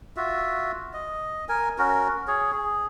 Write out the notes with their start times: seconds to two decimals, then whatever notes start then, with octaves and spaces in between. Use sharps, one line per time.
0.17 F4 F#4 E5
0.93 D#5
1.49 A#4 G#5
1.78 C#4 F#4 A#4
2.28 G#4 C#5
2.52 G#4